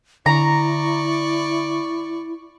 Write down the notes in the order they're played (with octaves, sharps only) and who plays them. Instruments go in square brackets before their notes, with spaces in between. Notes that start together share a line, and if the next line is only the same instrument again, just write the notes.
[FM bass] D3 [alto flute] E4 [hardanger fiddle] D5 C#6 [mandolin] A#5